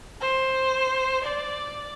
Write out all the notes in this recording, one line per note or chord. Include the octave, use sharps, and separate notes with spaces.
C5
D5